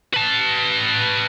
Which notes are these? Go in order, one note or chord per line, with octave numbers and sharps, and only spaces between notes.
B4 A5